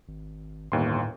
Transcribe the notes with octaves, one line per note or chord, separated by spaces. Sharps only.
G#1
G1 D#2 A2 C6